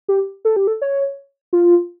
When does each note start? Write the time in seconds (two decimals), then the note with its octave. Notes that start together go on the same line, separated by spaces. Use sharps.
0.08 G4
0.45 A4
0.56 G4
0.67 A4
0.82 C#5
1.53 F4